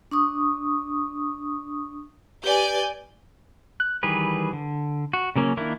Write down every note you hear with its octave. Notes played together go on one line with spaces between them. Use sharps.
D4 C#6 D#6
G4 B4 D5 G#5 G6
F#6
D#3 E3 G3 G#4 B4
D3
F#4
C#3 F#3 A#3 C#4
D#3 A#3 D4 E4